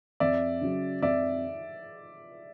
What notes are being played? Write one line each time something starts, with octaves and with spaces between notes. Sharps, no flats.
F2 D5 E5
C#3 F#3
F2 D5 E5